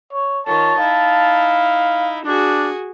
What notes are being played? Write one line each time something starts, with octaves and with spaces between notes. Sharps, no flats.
C#5
D#3 F4 C#5 A5
D#4 E4 F5
D4 F#4 G#4